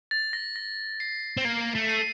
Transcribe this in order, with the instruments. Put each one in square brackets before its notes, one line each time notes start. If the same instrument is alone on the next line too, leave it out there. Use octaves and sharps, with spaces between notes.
[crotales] A6
A#6
A#6
C7
[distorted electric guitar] C4
A#3
A3
[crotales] C7 D#7